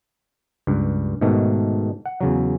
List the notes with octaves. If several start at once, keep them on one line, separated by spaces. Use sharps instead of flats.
C#2 G2
G#2 B2 D#3 A3
F#5
E2 C#3 F#3